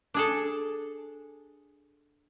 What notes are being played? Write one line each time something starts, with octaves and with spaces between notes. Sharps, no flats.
D4 G#4 A4